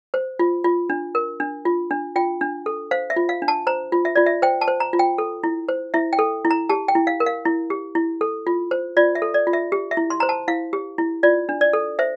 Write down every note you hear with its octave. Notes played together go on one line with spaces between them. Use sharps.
C5
F4
F4
D4
A#4
D4
F4
D4
F4 G5
D4
A4
C5 F5
E5
F4
F5
D4
A5
C5 A#5
F4
E5
F4 D5
E5
C5 G5
A5
C5
A#5
F4
G5
A4
E4
C5
E4 E5
G5
A4
E4
A#5
G4 A5
G5
E4
F5
A#4
F5
E4
G4
E4
A4
F4
C5
F4 D5
E5
A4
D5
F4
E5
G4
E5
E4
C6
C5 A#5
A5
E4 F5
G4
E4
F4 D5
D4
D5
A4
C5 E5